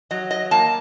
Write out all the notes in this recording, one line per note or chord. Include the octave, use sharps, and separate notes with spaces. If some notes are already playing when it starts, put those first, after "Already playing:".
F#3 D#5
D#5
A#3 A5